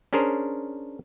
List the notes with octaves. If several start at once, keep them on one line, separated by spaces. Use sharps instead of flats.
C#4 D4 G#4 A#4 C5